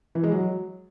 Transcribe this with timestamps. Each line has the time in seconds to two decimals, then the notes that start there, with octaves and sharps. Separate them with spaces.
0.15 E3
0.23 G#3
0.32 F#3